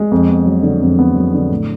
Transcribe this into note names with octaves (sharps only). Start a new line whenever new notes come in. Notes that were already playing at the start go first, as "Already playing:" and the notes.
Already playing: G#3
F2
B3
F#3
D3
F2
B3
F#3
D3
A2